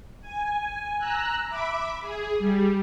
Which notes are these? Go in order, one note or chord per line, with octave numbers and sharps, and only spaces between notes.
G#5
A#5 E6 F#6
E5 B5 D6
G#4
G3